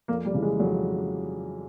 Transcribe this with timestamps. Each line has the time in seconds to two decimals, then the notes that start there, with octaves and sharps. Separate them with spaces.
0.08 F2 A#3
0.25 G3
0.34 C#3 E3
0.42 G#3
0.60 F2 F#3